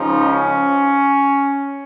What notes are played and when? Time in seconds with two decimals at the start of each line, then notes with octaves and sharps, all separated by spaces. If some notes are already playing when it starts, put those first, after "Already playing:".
Already playing: C#2 C#3 F3 D#4
0.26 C#4